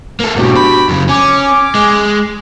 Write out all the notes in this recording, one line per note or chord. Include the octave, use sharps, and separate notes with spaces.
A#3 A4
G#2 B2 D4 F#4 G4
B5
F#2 C#3
C#4 G#5 D6
G#3